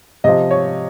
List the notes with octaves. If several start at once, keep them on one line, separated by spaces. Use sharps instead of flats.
C3 F3 D#5
C#5